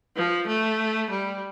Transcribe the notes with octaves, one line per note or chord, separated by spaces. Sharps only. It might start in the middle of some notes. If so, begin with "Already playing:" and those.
F3
A3
G3